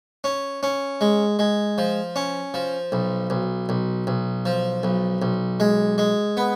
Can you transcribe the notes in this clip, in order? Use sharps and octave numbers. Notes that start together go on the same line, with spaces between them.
C#4
C#4
G#3
G#3
F3
C#4
F3
B1
B1
B1
B1
F3
B1
B1
G#3
G#3
B3